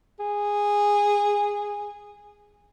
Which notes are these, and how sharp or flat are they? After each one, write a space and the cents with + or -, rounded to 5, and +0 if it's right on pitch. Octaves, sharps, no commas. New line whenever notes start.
G#4 -15